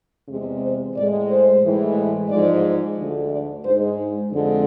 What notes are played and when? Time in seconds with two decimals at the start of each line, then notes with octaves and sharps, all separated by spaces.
0.28 E2 C3 G#3
0.62 C5
0.95 A2 G#3 D5
1.28 C5
1.63 A2 E3 G#3
2.29 G#2 F3 G#3 D5
2.97 D2 D3 A3
3.30 D5
3.64 G#2 G#3 C5
4.31 F2 D3 G#3